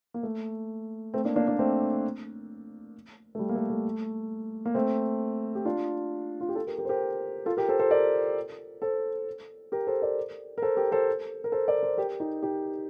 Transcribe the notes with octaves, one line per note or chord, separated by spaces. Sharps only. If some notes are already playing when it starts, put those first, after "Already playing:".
A#3
A3
A3 C4
A#3 D4
A#3 D4
A#3 D4
A3 C4
A3
G3
A#3
A3
A3
A#3
A3 C4
G4
D4 F4
F4
G4
F4 A4
G4 A#4
G4 A#4
C5
G4 A#4
F4 A4
G4 A#4
A4 C5
A4 C5
A#4 D5
A4 C5
G4 A#4
A4 C5
A#4 D5
A#4
A4 C5
G4 A#4
A4 C5
A#4
A4 C5
A#4 D5
A4 C5
G4 A#4
D#4 G4
D#4 G4